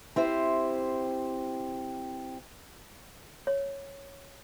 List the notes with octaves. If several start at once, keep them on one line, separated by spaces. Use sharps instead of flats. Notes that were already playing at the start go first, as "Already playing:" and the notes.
C4 E4 G4 C5
C#5